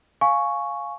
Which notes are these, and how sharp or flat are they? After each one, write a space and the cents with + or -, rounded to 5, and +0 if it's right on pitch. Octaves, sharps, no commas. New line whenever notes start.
F5 +0 G#5 +15 C#6 +0